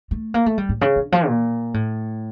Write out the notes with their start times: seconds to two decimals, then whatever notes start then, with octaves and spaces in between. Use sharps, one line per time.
0.11 A3
0.34 A#3
0.46 A3
0.58 G3
0.69 A2
0.81 C#3
0.96 D3
1.12 F3
1.27 A#2
1.74 A2